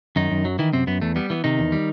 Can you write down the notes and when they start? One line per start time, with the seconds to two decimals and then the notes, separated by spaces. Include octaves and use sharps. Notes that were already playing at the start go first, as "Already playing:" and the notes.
0.16 F#2 D#3 D#4
0.31 F#2
0.45 F#3
0.59 D#3 E3 E4
0.73 F#2 C3 C4
0.87 F#2 B3
1.02 E2 A3
1.16 G3 B3
1.30 E3 B3
1.44 C3 D#3 D#4
1.59 E2
1.72 G3